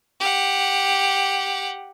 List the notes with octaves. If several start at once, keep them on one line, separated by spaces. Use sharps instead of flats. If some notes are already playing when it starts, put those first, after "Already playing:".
G4 F#5